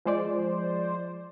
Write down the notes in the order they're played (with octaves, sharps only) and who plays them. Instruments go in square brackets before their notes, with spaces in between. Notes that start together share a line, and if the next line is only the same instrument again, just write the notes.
[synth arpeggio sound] F3 G#3 C5 D5